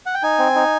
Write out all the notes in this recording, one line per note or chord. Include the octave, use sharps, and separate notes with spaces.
F#5
G5
D#4 G#5
C4
D#4